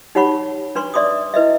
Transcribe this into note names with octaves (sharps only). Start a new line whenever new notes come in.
D#4 G4 C#5 F#5 B5 C#6
D4 B4 C6 C#6
D5 E5 C6 D6 D#6
E4 B4 D#5 E5